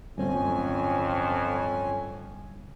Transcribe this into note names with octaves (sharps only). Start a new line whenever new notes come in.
D1 G1 F2 C4 C#4 G#5